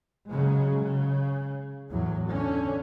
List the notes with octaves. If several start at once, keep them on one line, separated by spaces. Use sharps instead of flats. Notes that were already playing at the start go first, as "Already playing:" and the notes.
C#3 F#3 G#3
C#3
E2 A2 F#3
D3 C#4